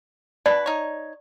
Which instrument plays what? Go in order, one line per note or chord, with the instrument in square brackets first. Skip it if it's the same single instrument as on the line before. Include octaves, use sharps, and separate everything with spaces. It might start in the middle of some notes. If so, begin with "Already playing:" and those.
[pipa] B2 D4 B4 [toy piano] D5
[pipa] D#4 C#5